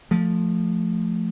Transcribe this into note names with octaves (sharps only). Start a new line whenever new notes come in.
F3 A3